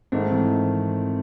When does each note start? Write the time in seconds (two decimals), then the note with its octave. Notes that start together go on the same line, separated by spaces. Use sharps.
0.12 G#2 D#3 A3 C4
0.32 E3